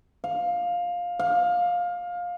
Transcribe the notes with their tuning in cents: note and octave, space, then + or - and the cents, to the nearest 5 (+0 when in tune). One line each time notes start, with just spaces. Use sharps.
F5 +15
F5 +20